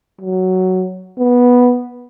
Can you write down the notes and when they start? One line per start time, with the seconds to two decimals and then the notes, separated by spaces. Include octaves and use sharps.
0.21 F#3
1.19 B3